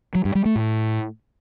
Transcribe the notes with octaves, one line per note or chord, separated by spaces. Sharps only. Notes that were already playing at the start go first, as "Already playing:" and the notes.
F#3
G2
G3
A3
A2